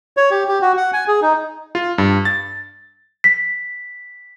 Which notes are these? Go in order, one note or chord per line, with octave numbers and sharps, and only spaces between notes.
C#5
G4
G4
F#4
F#5
G#5
G#4
D#4
F4
G2
A6
B6